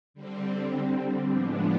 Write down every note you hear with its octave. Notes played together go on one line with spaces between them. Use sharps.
D3 G3 C4
A2 F3 G#3 B3 D4